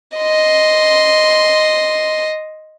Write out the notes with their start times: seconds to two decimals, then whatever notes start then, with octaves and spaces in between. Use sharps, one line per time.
0.17 D#5 C6